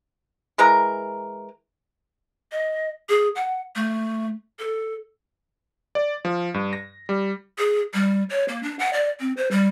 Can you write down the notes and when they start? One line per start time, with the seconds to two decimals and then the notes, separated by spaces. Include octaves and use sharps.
0.58 E3 G#3 A#4 A#5
2.52 D#5
3.09 G#4
3.36 F#5
3.76 A3
4.59 A4
5.95 D5
6.25 F3
6.54 G2
6.73 A#6
7.09 G3
7.58 G#4
7.94 G3
8.30 C#5
8.48 A#3
8.63 D4
8.79 F#5
8.93 D5
9.20 C4
9.37 C5
9.51 G3